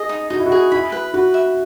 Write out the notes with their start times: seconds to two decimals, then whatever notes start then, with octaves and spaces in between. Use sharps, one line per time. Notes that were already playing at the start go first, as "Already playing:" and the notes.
Already playing: G#4 D#5
0.09 D#4
0.30 D#4 F#4
0.39 E4
0.46 F#4
0.52 G#4
0.72 E4 B5
0.92 B4
1.14 F#4 B4
1.34 E5